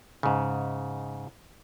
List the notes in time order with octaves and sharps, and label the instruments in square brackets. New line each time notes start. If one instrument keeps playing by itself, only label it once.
[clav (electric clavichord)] G#2 C#3